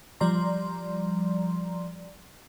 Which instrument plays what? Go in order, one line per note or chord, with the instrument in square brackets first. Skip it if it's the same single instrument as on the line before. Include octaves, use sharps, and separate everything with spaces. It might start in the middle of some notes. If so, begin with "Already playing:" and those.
[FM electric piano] F3 G3 D5 A#5 C6